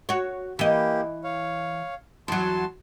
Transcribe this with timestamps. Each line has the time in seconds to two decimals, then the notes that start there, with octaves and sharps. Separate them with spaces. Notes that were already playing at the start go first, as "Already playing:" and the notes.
0.09 F#4 C#5
0.59 E3 A#3 G4 D#5
1.24 C#5 F5
2.28 E2 F#3 A5 C6